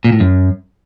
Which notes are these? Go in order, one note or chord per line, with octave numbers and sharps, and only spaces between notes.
A#2
A2
F#2